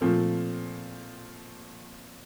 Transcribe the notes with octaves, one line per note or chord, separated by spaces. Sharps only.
A#2 F3 A3 C4